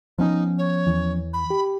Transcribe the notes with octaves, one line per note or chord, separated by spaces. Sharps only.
F3 B3 C#4 D#4
C#5
E2 E3
B5
G4